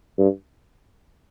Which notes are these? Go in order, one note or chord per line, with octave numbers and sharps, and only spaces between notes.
G2